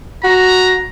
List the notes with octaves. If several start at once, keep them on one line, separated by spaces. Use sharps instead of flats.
F#4 A#5